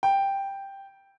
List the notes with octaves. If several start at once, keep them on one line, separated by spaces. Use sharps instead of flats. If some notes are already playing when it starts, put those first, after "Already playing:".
G5